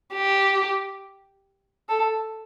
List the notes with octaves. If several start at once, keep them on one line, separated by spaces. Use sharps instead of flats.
G4
A4